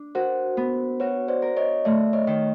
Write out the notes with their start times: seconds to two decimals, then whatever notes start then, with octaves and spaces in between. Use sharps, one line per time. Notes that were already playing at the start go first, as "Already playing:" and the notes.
Already playing: D4
0.15 F#4 A#4 C5
0.57 B3
1.00 F#4 B4 C#5
1.28 C5 D5
1.42 A#4
1.57 C#5 D#5
1.85 A3 D5 E5
2.13 C#5 D#5
2.27 D#3